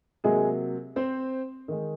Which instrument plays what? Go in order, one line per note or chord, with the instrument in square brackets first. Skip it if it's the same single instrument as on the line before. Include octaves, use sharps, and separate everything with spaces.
[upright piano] C3 F#3 G#3 A#3 G#4
C4 C5
D#3 G#3